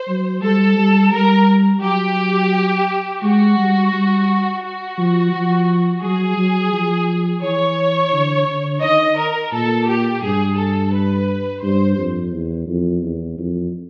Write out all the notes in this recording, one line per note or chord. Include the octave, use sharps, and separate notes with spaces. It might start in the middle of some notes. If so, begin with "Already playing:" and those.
Already playing: C5
F#3
G3 A4
G3
G3 A#4
F#3 G4
G#3 F#4
G3
G3
F#4
F3
F3
F#3 G#4
F#3
F3
E3 C#5
D3
D3
D#3 D#5
A#4
A#2 A4
G4
G2 G#4
A4
B4
G2 C5
F2
E2
F2
E2
F2